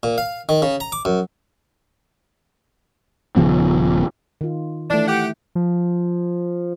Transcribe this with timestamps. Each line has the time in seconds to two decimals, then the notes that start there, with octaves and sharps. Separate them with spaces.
0.03 A#2
0.18 F5
0.49 D#3
0.62 C#3
0.80 A#5
0.92 D6
1.05 F#2
3.36 D#1 C#3 F3 B3
4.41 D#3 F4
4.90 E3 A3 D4
5.08 G4 F#5
5.55 F3